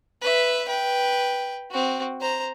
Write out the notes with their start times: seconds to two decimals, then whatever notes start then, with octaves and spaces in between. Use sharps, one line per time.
0.21 B4 E5
0.68 B4 G5
1.71 C4 F#4
2.21 C5 A#5